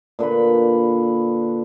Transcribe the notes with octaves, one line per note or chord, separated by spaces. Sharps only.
A#2 D3 B4 B5